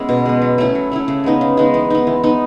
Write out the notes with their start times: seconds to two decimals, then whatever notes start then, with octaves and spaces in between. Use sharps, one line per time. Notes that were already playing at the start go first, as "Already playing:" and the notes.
Already playing: G#3 B3 C#4 E4
0.09 B2
0.26 G#3 B3
0.42 F#3
0.58 A3 C#4 E4
0.75 F#3
0.92 A3 C#4 E4
1.08 C#3
1.24 G#3 B3 D#4
1.41 C#3
1.57 G#3 B3 D#4
1.74 E3
1.90 B3 D#4
2.07 E3
2.23 B3 D#4